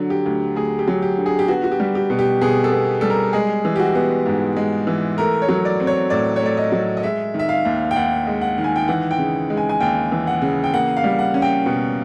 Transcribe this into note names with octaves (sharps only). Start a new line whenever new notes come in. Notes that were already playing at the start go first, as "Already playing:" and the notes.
Already playing: D3 F#3
G4
D2
D2 G#4
G4
F#3
G4
D3
G#4
G4
B3 F#4
F#4
G4
G3
G4
B2
G4
B2 G#4
A4
B3
G3 A4
A#4
G#3 G#4
E3
G4
F#4
B3
G#2
G#3
E3
A3 A#4
C#5
F#3
D5
C4
C#5
A2 D5
C#5
A3 D5
D#5
F#3
D#5
G#3 E5
D#3
E5
F5
D#2
G5
D#2 F#5
G#3
F#5
D#3
G#5
G5
E3 F#5
G5
C#3
G#3
G#5
G#5
D#2 G5
E3
F#5
C#3
G5
A#3 F#5
F5
G3
F#5
C#4
G5
B2